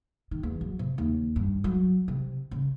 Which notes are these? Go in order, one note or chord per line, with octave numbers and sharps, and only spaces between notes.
D#3
E2
F#3
C3
D#2
G2
F#3
C3
C#3